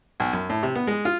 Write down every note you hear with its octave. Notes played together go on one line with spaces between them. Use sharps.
B1
F#2
A2
C3
B3
G#3
F4